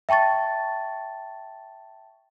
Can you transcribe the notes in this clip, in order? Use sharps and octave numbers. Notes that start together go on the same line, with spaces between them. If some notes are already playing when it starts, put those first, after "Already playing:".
E5 G5 A5 C#6 A6